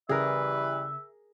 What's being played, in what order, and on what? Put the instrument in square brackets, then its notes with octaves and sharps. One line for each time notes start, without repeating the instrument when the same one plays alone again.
[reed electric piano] C#3 [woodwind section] E3 G3 B4 [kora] G#4 A#4 [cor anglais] E5